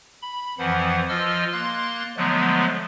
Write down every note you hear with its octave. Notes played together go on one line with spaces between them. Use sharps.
B5
F2 E3 F3 F#5
F3 F4 D#5 E6 F6
A#3 C6 F#6 A6
D3 F3 F#3 G#3 A3 B3